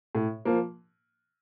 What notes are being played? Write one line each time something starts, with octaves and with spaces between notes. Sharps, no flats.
A2
F3 A#3